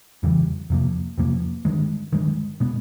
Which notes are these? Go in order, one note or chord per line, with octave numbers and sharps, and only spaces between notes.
F2 C#3 E3 G3
F2 C3 F3 A#3
F2 C3 F3 A#3
G2 D#3 G#3
G2 D#3 G#3
B2 G#3 B3